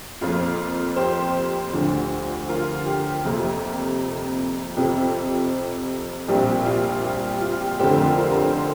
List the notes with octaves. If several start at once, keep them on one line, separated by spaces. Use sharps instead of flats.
F2 F3 A#3 F4
G4 C5
D2 D3 F3
F4 A#4
G4
F2 C3 F3 A#3
F2 C3 F3 C4 G4
A#1 A#2 G3 C4 G4
F4
G4
F4
G4
F1 F2 D3 F3 G4 C5
F4 A#4
F4 A#4
A#4
G4 C5